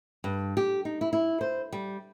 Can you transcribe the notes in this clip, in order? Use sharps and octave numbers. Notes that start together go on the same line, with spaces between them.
G2
G4
D#4
E4
E4
C5
G3